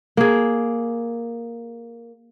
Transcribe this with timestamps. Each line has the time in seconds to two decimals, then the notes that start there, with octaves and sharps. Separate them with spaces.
0.17 A#3 G#4